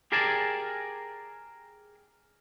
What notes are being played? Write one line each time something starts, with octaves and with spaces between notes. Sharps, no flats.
G4 G#4 A#4 D5 G#5 A5